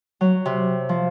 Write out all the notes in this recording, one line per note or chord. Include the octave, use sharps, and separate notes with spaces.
F#3
C3
F3